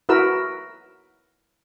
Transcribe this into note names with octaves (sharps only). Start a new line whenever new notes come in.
E4 F#4 A#4 B4 E6